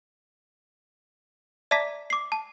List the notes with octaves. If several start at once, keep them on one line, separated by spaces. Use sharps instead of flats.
D5 E5 A5 A#5 D6 B6
D6 C7
A5